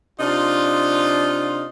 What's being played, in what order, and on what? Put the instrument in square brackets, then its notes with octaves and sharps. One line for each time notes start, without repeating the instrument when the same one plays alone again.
[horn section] C3 D4 D#4 F4